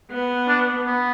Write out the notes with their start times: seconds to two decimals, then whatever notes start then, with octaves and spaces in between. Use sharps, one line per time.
0.11 B3
0.48 D4
0.85 B3